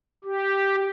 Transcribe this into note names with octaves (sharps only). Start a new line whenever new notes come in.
G4